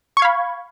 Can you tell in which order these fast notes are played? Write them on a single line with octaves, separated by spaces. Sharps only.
C#6 G#6 F5 B5